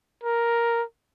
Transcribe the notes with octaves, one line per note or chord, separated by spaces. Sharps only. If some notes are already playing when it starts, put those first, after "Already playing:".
A#4